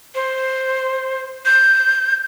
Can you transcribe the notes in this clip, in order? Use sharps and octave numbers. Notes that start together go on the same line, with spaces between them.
C5
G6